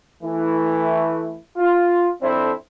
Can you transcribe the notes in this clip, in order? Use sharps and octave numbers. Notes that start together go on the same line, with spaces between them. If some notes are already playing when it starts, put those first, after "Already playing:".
E3 A3 E4
F4
F2 C4 D4 E4 A4 C5